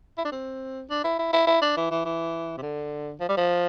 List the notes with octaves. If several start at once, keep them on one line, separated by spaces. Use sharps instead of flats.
E4
D4
C4
D4
E4
E4
E4
E4
D4
E3
E3
E3
C3
D3
F3
G3
F3